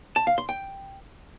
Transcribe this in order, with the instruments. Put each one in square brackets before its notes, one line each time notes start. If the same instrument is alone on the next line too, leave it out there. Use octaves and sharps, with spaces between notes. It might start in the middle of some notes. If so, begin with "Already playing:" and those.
[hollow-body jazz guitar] A5
F5
C6
G5